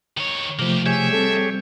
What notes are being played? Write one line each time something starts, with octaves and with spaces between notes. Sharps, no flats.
D#3 C#5
C3 F3 A3 A#3 G4
G4 G#4 C#5 E5 G#5
G3 C4 A4